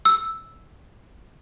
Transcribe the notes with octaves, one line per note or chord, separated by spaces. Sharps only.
E6